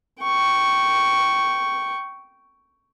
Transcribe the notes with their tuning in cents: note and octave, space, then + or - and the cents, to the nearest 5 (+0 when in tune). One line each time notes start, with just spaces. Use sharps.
G5 -15 C#6 +0